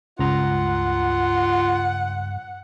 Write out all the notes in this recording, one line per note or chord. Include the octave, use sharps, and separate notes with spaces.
C#2 G2 F4 F#5 A#5